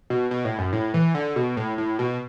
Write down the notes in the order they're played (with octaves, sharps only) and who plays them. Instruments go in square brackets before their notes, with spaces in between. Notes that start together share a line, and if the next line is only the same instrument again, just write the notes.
[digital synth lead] B2
B2
A2
F#2
A2
E3
D3
B2
A2
A2
B2